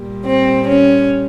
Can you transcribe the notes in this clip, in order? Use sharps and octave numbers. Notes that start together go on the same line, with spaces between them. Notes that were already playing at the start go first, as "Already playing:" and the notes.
Already playing: A#2 G3
C4
C#4